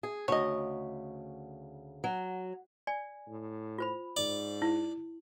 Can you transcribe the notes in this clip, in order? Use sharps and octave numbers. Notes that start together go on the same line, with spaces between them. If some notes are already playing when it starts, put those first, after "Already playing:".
G#4
D2 C#3 C#5 D#5
F#3
D5 G#5
A2
F4 C5 B5
G#2 D5
E4